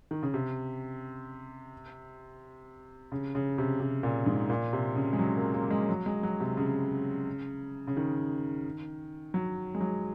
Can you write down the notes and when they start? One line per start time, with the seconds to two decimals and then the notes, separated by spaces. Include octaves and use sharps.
0.11 D#3
0.23 C#3
0.34 C3
3.12 C#3
3.35 C#3
3.58 C3
3.80 C3
4.03 A#2
4.26 G#2
4.50 A#2
4.73 C3
4.95 C#3
5.13 G#3
5.19 F#3
5.37 A#3
5.54 A#3
5.70 G#3
5.89 F#3
6.06 G#3
6.23 F#3
6.40 C3
6.57 C#3
7.87 C#3
7.97 D#3
9.34 F#3
9.75 G#3
9.81 F#3